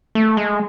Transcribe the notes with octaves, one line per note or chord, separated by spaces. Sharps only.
A3
G#3